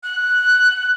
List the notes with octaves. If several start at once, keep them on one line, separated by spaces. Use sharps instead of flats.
F#6